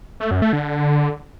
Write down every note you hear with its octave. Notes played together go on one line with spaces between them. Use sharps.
A3
F#2
A3
D3